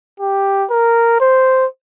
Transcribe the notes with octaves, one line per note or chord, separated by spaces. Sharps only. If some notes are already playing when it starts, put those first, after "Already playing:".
G4
A#4
C5